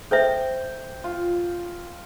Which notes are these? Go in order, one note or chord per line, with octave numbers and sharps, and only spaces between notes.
A4 C5 E5 G5
F4